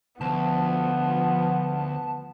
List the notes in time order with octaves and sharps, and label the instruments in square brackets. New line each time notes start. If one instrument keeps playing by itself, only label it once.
[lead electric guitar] D2 [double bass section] F3 [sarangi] B3 [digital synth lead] A5